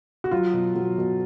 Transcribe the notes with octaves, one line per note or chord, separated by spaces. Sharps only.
F#4
F#3 F4
B2
F#3
B2